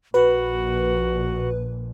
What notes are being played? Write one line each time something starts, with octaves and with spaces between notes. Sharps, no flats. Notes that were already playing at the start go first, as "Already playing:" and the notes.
A#1 A#2 F#4 B4